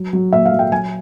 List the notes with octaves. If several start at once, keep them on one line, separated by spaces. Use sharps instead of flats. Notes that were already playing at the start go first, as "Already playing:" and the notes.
Already playing: F#3
F#3
A#2 E5
F5
F#3
G5
F#3 G#5